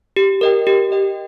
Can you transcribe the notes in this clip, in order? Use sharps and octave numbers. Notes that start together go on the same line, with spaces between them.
G4
A#4 D#5 G5
G4
A#4 D#5 G5